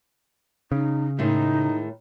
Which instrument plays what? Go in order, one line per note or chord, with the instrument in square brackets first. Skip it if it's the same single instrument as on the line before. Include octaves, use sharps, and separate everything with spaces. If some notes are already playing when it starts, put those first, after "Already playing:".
[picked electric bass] C#3 [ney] D#4
[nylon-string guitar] A2 D#3 G#3 [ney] D#4